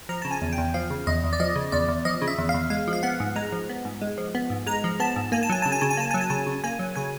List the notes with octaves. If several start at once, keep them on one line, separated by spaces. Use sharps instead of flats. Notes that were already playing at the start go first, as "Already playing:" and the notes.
F3 A#5
C#3 A5
G#5
E2
G5
E2
F3 F5
C#3
E2 D#5
E2
D5
F3 D#5
C#3
E2 D5
E2
F3 D#5
C#3
E5
E2
F5
E2
G#3 F5
F3
F5
B3 F#5
G#2
G#3 A#5
F3
B3
G#2
G#3
F3
B3
G#2
G#3 A#5
F3
B3 A5
G#2
A#3 G#5
A5
F#3 G#5
C#3 A5
G#5
C#3 A5
G#5
A#3 A5
F#3 G#5
A5
C#3 G#5
C#3
A#3 G#5
F#3
C#3 G#5